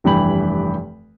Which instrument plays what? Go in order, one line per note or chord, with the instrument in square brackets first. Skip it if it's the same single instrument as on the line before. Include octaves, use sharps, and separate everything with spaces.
[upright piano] F1 G2 E3 G5 B5 F#7